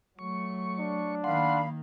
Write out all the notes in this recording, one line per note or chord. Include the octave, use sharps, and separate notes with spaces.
F#3 A3 C#6
D4
D#3 A#3 F5 F#5 B5 C6